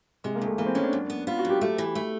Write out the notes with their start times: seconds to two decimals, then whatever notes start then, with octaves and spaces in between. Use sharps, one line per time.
0.24 C3 G#3
0.35 A#3
0.41 D2 A3
0.58 E3 A#3
0.66 C4
0.75 G#3 C#4
0.83 D4
0.93 F#2
1.10 B3
1.27 B3 F4
1.39 F#4
1.45 F#2 G4
1.61 A3 G4
1.78 E3
1.95 A3